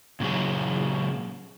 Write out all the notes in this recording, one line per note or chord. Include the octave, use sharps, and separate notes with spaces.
A#2 C#3 F#3 G#4